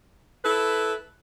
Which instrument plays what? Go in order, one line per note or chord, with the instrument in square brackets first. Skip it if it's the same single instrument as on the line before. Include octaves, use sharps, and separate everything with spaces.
[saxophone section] E4 A4 B4